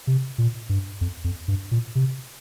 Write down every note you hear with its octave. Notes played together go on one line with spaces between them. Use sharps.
C3
A#2
G2
F2
F2
G2
A#2
C3